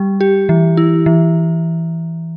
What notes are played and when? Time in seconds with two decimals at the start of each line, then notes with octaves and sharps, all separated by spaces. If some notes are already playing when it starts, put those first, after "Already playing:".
Already playing: G3
0.21 G4
0.49 E3
0.77 E4
1.06 E3